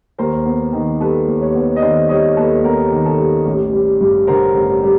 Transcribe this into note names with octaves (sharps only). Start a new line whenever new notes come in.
D#2 A#4 C5
B3
D#3
G3 A4 B4
D#2
B4 C#5
B3
D#5
D#3 C5 D5
G3 C#5 D#5
D#2 A4 B4
B3 A#4
D#3
A4
G3
A1
G3
G2
D3 A#4 C5
A1
G3